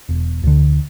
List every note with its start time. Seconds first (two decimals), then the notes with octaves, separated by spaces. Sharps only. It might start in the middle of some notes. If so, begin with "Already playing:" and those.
0.09 E1
0.44 D2 D3